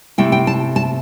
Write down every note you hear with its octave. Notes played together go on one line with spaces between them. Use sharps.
C3 A3 E4 G5
G5
A5
A5